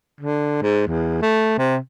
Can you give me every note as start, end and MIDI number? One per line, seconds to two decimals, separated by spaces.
0.21 0.61 50
0.62 0.86 44
0.88 1.21 40
1.22 1.55 57
1.58 1.77 48